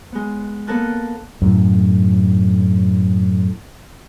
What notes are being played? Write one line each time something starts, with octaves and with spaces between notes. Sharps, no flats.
G#3 B3
A#3 B3 A4 A#4 A5 F#6
F#2 A2